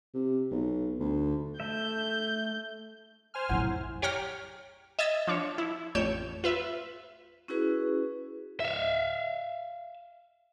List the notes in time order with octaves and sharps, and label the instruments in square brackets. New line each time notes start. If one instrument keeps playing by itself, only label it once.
[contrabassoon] C3
B1
D2
[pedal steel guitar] A3 E5 [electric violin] G6
[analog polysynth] C5 G#5 F6
[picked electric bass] A#1 F2 F#3 [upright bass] A2 C#3 [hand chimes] E4 F#5
[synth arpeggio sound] G4 C#5 G5 A#5 F6
D#5 E5 E6 G#6 A6
F3 D4 C#5
E4
A1 F2 C#5 G6 D7 E7
F4 B4 E5
[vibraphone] C#4 E4 F#4 G#4 B4
[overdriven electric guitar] E5 F5